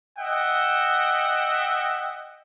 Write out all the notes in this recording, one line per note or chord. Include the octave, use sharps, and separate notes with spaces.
D#5 E5 F#5 G5